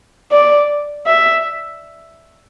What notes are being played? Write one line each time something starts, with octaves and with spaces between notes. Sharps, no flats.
D5
E5